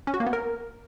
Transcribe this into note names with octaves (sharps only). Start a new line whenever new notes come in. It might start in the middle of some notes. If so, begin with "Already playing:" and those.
C#4
F#4
A#3
B3
A#4